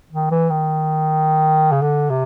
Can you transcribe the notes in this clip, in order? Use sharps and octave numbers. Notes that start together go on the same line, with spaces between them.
D#3
E3
D#3
C#3
D3
C3